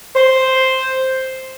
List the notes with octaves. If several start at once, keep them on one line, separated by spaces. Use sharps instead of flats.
C5